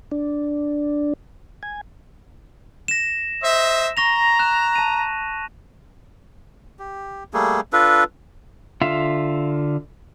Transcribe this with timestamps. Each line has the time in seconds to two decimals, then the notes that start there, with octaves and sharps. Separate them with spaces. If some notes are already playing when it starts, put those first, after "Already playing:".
0.12 D4
1.63 G#5
2.88 A#6 E7
3.42 C5 D#5 E5
3.97 A#5 C#6 A#6 F7
4.39 F#6 E7
4.76 A5 D#7
6.79 G4
7.34 G3 A3 A#3 G#4
7.73 D4 F4 A4 B4
8.82 D3 F4 E5 F5